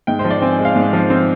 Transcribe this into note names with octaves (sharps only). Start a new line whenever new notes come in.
G#2 G5
C5
F3
D5
C4 G#5
G#5
G#3
F5
G#2
F3
C4